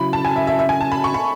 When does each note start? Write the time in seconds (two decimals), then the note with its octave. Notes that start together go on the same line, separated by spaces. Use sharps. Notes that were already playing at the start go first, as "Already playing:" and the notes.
Already playing: C#3 F#3 C#4 E4 B5
0.13 A5
0.25 G#5
0.36 E5
0.47 E5
0.59 E5
0.69 G#5
0.81 A5
0.92 B5
1.04 C#6
1.14 B5